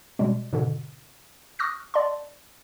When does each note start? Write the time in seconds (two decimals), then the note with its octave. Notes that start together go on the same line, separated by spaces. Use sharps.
0.19 B2 G3 G#3
0.53 G#2 B2 D3
1.59 C#6 D#6 F6 F#6 A#6
1.94 D5 A5 C6